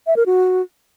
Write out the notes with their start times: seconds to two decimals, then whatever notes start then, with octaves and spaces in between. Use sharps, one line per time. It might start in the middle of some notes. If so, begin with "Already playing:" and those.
0.07 E5
0.16 A#4
0.26 F#4